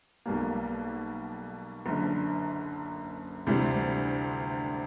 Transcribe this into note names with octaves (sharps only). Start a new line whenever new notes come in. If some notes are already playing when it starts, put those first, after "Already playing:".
B1 B2 G3 A#3
F#1 F#2 D3
D2 C3 E3 G3 C4